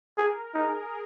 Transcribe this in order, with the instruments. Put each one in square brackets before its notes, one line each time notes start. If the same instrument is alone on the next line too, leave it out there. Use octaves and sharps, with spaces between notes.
[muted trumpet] G#4 [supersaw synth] A#4
[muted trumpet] D#4 [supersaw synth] G#4